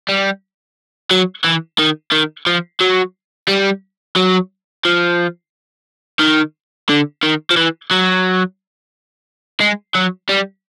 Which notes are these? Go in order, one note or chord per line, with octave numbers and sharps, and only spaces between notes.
G3
F#3
E3
D#3
D#3
F3
F#3
G3
F#3
F3
D#3
D3
D#3
F3
E3
F#3
G#3
F#3
G3